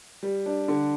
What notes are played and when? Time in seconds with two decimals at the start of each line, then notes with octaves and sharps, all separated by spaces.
0.23 G3
0.46 D4
0.68 D3